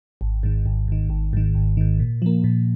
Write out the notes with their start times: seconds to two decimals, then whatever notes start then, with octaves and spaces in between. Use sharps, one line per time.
0.21 G#1
0.43 G#2 D#3
0.66 G#1
0.88 G#2 D#3
1.10 G#1
1.33 G#2 D#3
1.55 G#1
1.77 G#2 D#3
2.00 A#2
2.22 F3 A#3
2.44 A#2